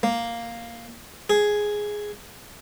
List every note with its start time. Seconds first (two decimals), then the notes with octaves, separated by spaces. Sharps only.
0.03 A#3
1.30 G#4